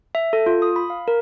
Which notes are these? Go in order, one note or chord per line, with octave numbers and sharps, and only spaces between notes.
E5
A4
F4
D#6
B5
F5
A#4